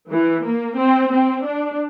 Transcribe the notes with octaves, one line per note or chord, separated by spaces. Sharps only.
E3
A#3
C4
C4
D4